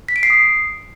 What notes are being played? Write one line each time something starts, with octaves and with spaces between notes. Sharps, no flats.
B6
D7
C7
D#6